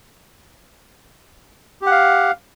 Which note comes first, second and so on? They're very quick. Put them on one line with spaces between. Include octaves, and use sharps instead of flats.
G4 F#5 F5